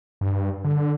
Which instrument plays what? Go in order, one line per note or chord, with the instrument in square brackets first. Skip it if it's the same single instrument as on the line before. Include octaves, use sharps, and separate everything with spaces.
[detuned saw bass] G2
D3